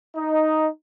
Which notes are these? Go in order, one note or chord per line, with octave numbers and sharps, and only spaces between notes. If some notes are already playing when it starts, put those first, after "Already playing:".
D#4